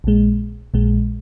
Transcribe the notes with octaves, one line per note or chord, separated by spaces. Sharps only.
A#1 A#2 G#3
A#1 A#2 G#3